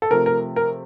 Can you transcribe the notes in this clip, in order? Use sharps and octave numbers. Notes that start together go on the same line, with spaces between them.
A4
C3 F3 A3 A#4
A#4
A#4